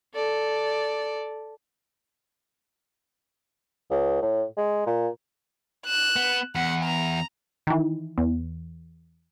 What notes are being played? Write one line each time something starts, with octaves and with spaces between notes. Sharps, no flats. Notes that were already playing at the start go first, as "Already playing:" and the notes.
A4 D5
C#2
A2
G#3
A#2
F#6 E7
B3
E2 F#5
A#5
D#3 E3
E2